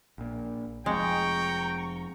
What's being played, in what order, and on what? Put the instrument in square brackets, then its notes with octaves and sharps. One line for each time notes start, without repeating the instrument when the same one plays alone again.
[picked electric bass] A#1 A#2
[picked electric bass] F1 F3 C4 [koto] G#3 [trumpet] G5 [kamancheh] A#5 C#6